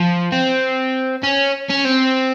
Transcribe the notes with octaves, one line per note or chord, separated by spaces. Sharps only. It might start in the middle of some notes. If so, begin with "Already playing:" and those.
Already playing: F3
C4
C#4
C#4
C4